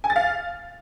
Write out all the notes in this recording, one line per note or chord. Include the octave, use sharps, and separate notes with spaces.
G#5
A6
F5